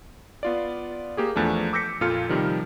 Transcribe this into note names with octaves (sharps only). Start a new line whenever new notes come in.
B3 F4 D5
A#3 G4 G#4
E2 F3 A3 D4
D6 E6 G6 A#6 B6 C#7
F2 A#2 F4 A4 F6 C#7
C3 D#3 F3 G3